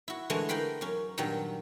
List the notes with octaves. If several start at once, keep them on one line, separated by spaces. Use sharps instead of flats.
E4 F#4
D3 E3 G#3 A3 F#4 G#5
D#4 A#4 G5 B5 C6
F#2 C#4
G2 A#2 D#3 F#3 G3